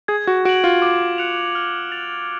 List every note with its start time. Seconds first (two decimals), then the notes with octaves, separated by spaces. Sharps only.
0.08 G#4 G#6
0.27 F#4
0.45 F#4 D7 F#7
0.64 F4
0.82 D6
1.18 F#6 C#7 F7
1.55 F6
1.92 A6 F7